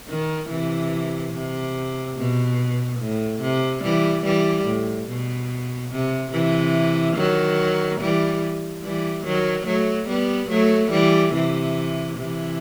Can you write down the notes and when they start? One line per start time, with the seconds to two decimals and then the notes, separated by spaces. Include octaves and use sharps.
0.08 D#3
0.49 C3 E3
1.33 C3
2.17 B2
3.00 A2
3.41 C3
3.83 E3 G3
4.25 E3 G3
4.66 A2
5.08 B2
5.92 C3
6.33 C3 E3
7.16 D#3 F#3
8.01 E3 G3
8.83 E3 G3
9.25 D#3 F#3
9.67 F#3 A3
10.09 G3 B3
10.50 F#3 A3
10.92 E3 G3
11.34 C3 E3
12.18 C3 E3